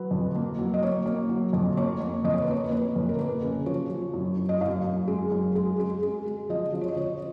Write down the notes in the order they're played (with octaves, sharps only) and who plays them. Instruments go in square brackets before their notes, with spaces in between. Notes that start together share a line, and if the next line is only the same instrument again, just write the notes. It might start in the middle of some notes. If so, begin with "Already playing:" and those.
Already playing: [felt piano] F#3 B4
F2
A#3
F#3
D#5
A#3 C#5
A#3
F#3
F2
A#3 C#5
A#3
F2 D#5
C#5
B4
A#3 C#5
C#5
A#3 B4
F2
A#4
A#3 B4
C#3
F3 C#5
F3
F#2
F#2
D#5
F#2 F5
F#2
G#3
F#2
G#3
G#3
G#3
G#3
F3 D#5
F3
C#5
D#5
F3 C#5